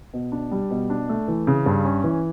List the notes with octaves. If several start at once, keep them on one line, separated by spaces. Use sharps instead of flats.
B2
D4
G3
B2
D4
A3
E3
C#3
G2
C#4
E3